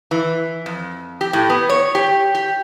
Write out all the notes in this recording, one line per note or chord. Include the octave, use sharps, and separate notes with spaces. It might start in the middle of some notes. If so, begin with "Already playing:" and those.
E3
F2
G4
A2
B3
C#5
G4
G4